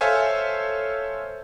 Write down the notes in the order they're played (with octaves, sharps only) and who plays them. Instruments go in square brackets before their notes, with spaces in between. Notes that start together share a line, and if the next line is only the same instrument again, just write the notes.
[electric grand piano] A4 C5 C#5 E5 F5 G#5